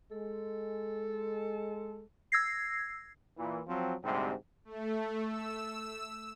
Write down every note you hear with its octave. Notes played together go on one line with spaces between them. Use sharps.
G#3 A4
E6 G#6 A#6 C7
A#2 E3
F3 F#3 C4
D2 G#2 C3 G3 C4
A3
E6